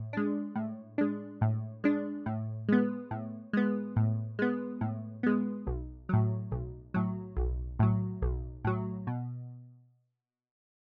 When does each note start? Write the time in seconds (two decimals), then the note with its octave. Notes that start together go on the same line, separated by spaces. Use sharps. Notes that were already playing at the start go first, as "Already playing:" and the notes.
Already playing: A2
0.13 G#3 D4
0.56 A2
0.98 G#3 D4
1.41 A2
1.84 G#3 D4
2.26 A2
2.69 G#3 B3
3.11 A2
3.53 G#3 B3
3.96 A2
4.39 G#3 B3
4.81 A2
5.23 G#3 B3
5.67 B1
6.09 A2 F#3
6.52 B1
6.94 A2 F#3
7.37 B1
7.79 A2 F#3
8.22 B1
8.65 A2 F#3
9.07 B2